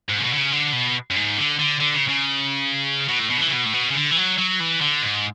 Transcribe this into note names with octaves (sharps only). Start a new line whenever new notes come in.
G#2
C#3
B2
D3
C#3
D3
B2
F#2
G#2
D3
D3
D3
C#3
C#3
B2
A2
B2
D3
E3
C#3
B2
A2
B2
C#3
D3
E3
F#3
F#3
E3
D3
G#2